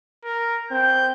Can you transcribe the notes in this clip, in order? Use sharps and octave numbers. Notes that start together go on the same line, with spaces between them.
A#4
C4 G6